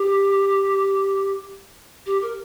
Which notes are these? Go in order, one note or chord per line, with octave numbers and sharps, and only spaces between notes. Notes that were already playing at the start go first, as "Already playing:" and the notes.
Already playing: G4
G4
A#4